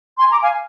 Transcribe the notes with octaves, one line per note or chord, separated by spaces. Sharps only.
G#5 C6
A#5 D6
F5 G#5